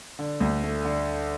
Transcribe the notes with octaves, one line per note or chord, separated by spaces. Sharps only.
D3
D2
A3
D3